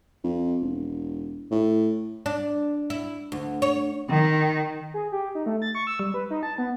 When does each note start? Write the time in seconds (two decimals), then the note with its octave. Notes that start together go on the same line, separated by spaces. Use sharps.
0.24 F2
0.61 E1
1.51 A2
2.26 D4
2.90 E4
3.32 D2
3.62 C#5
4.09 D#3
4.94 G#4
5.12 G4
5.35 D#4
5.46 A3
5.62 A6
5.75 C#6
5.87 E6
6.00 G3
6.14 B4
6.30 D#4
6.43 A5
6.58 B3